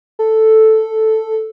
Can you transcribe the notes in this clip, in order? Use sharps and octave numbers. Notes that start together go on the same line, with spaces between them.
A4